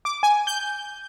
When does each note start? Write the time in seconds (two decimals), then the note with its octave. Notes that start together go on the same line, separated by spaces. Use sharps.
0.05 D6
0.23 G#5
0.47 G6